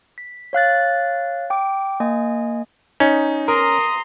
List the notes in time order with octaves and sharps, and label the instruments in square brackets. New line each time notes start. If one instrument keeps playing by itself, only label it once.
[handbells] B6
C#5 F5 F#6 A6
G5 D6
A#3 D#5 G#5
[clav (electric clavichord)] C#4 [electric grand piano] D#4
[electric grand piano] A#4 [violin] A#5 C6 [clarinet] D#6